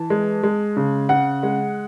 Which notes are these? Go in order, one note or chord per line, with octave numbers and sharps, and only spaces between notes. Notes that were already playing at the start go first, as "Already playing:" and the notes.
Already playing: E3 A5
G#3
G#3
C#3
C#3 F#5
G#3